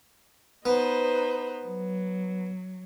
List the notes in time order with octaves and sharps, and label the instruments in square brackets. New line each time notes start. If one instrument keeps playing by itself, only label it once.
[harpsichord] B3 [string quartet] D#4 B4 C5
[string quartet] F#3